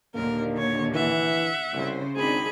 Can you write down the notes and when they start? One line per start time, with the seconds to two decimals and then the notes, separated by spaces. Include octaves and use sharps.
0.14 D#2 A#2 D3 A#3 A#4
0.57 C#5
0.95 E3 E5 F#5
1.73 C2 C#3 C5
2.16 G#1 C4 D4 D#4 G#4 B5